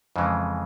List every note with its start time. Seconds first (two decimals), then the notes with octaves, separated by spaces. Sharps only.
0.16 F2 C#3 E3 G#3